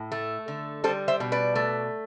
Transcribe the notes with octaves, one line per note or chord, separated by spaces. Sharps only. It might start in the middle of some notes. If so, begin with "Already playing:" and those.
Already playing: A2
A3
D3
G3 A4 C5
C5 E5
B2
B4 D5
A3